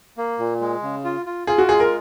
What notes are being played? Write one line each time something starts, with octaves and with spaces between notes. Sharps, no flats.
A#3
A#2
G#3
C#3
F4
F4
F4 G#4
F#4
G#3 G#4
A#4